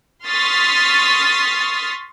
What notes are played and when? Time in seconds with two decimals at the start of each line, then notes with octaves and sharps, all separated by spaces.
0.25 C6 C#6 D#6 F6 A6 B6